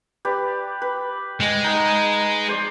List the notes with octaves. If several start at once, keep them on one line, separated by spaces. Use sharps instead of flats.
G4 B4 D5
B4
G#3
D#4 F#5
C5 D5